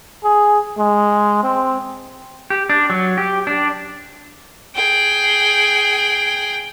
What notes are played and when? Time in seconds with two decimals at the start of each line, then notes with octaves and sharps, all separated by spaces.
0.24 G#4
0.78 G#3
1.43 C4
2.50 G4
2.69 D4
2.90 F#3
3.18 G4
3.47 D4
4.75 G#4 G5